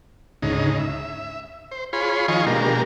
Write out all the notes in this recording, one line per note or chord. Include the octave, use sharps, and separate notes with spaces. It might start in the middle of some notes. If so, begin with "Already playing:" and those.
D2 G#2 C#3 D#4
E5
C5
F4 G#4 C#5 B5 C6
D#3 F3 F4 D#5 G#5 C#6
B2 G#3 A#3 D4 G4 A#4